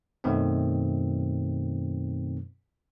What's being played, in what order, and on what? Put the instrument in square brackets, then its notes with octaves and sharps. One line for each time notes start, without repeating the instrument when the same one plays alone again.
[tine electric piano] F#2 B2 D#3 F#3 A3 C4